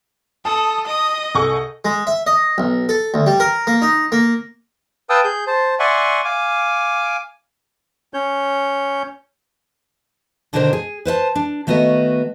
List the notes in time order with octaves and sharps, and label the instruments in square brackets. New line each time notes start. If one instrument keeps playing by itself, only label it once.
[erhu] A4 [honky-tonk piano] A5 [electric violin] D#6
[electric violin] D#5 [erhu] D#6
[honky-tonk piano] C2 G#4 C#6 [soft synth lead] A4
[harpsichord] G#3
E5
D#5
B1
A4
D2
G3
A#4
A#3
D#4
A#3
[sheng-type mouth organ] B4 F5 G5 A5 D#6 E6
G#4 G6
C5 A5
D5 E5 F#5 G#5 C6 C#6
F5 G#5 D6
[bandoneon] C#4 C#5 G6
[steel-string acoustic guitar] B2 D3 D#3 D4 A#4 C5
G#4
B4 C5 E5 A5
D4
D#3 A3 B3 F#4 D#5